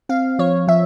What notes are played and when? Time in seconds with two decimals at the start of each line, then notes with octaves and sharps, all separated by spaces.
0.09 C4 F5
0.39 F3 C#5
0.68 F3 E5